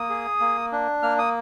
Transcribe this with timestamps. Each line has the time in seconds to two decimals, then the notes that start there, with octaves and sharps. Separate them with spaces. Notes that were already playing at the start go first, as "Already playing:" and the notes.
Already playing: A#3 D#6
0.10 G#4
0.40 A#3
0.72 D4
1.03 A#3 F6
1.19 D#6